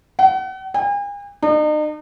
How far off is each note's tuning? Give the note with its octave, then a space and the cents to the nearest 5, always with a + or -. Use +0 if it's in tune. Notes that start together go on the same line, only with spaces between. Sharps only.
F#5 +40
G#5 -45
D#4 -40